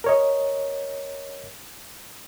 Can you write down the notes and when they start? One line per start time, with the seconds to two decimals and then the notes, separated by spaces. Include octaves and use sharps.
0.04 A#4 C#5 D#5